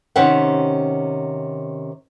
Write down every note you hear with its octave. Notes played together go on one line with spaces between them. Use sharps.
C3 D#3 C#4 G4 C5 F#5